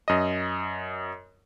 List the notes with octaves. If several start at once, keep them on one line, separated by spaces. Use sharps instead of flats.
F#2 D#5